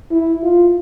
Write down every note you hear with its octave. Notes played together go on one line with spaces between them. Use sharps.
E4
F4